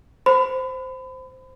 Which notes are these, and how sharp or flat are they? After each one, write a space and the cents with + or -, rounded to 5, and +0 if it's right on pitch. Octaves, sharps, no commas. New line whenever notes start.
C5 -5 B5 +30